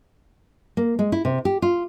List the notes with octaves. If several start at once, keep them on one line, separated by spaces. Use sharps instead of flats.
A#3
G#3
E4
C3
G4
F4